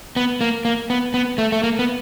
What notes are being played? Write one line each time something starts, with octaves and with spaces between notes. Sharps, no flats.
B3
A#3
A#3
B3
B3
A3
A3
A#3
B3